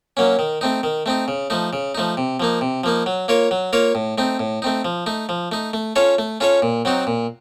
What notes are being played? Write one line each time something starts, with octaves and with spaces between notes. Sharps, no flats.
F#3 A#3 C#4
D#3
A3 C4 D#4
D#3
A3 C4 D#4
C#3
F3 A3 D#4
C#3
F3 A3 D#4
C3
F3 A#3 D#4
C3
F3 A#3 D#4
F#3
A#3 F4 A#4 C#5
F#3
A#3 F4 A#4 C#5
A2
A3 C4 D#4
A2
A3 C4 D#4
F3
A3 D#4
F3
A3 D#4
A3
C#4 F4 A4 C#5
A3
C#4 F4 A4 C#5
A#2
F#3 C4 D#4 F#4
A#2